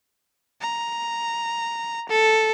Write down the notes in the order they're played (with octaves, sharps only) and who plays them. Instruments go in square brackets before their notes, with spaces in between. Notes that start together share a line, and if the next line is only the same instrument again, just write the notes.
[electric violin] A#5
A4